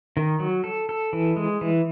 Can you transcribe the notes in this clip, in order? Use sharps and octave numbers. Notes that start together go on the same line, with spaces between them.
D#3
F#3
A4
A4
E3
G#3
E3